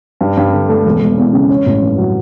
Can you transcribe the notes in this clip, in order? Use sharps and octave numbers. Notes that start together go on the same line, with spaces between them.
G2
G2
D3
A3
E1
E1
E2
C#3
C#4
A1
G2
F#3